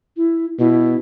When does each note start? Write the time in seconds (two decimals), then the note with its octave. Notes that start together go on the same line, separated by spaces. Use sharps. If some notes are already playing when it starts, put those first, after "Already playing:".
0.17 E4
0.59 B2 E4